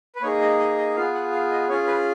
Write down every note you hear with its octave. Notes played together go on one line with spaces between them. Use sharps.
B4
A#3 D#4 G#4 C#5
D#5
D#5
D#5
B3 F4 G#4 F5
F#5
F5
D#5
C#4 F4 G#4 C#5
B4